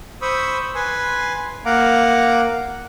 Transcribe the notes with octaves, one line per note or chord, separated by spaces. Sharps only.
C5 B5 C#6 D#6 E6
B4 G#5 C6
A#3 F5 F#5 A#5 D6